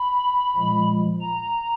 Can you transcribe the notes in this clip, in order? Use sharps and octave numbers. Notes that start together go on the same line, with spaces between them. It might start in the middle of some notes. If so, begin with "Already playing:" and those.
Already playing: B5
A#2 F3 G#3
A#5